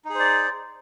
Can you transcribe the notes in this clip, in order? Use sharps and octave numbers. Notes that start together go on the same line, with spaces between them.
D#4 G#4 C5 D5